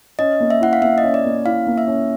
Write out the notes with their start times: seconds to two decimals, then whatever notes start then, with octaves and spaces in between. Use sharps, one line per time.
0.19 C#4 D#5
0.40 A#3
0.50 E5
0.61 E4 F#5
0.73 F5
0.82 A#3 E5
0.98 D#5
1.03 C#4
1.14 D5
1.25 A#3
1.45 E4 F5
1.67 A#3
1.78 E5
1.87 C#4